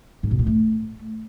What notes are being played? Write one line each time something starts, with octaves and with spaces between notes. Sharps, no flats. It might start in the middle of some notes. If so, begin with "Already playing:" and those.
G#2
B2
A2
A3